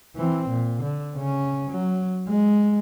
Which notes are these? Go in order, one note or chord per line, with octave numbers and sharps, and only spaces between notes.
E3 C4
A#2
D3
C#3 C#4
F#3
G#3